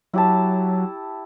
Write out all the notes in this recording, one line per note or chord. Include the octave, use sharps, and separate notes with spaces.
F#3 E4 G4 A5